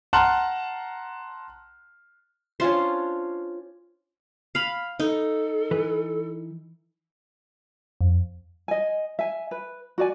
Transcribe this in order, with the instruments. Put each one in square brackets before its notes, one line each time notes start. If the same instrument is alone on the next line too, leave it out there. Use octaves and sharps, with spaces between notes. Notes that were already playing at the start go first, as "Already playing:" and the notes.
[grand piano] F#5 A5 A#5 C6 F6 F#6
[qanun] C#4 D4 F4 C5
F5 B5
[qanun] D#4 [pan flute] A4
[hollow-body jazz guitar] E3 B4
[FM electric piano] F2
[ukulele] D#5 G#5
E5 G#5
B4
F#4 D5 G#5